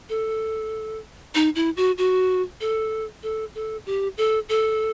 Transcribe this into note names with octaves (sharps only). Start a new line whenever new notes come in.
A4
D#4
E4
F#4
F#4
A4
A4
A4
G4
A4
A4